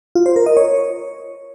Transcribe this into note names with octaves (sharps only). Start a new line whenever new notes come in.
F4
C5
A#4
D#5
C#5